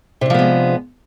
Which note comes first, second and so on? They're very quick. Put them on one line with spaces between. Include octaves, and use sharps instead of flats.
C3 D4 F3 B3 G#3